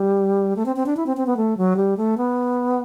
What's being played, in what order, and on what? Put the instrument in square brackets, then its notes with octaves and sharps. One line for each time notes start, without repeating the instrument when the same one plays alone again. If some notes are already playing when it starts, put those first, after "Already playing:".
Already playing: [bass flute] G3
A3
C4
C4
D4
E4
C4
C4
B3
A3
F#3
G3
A3
B3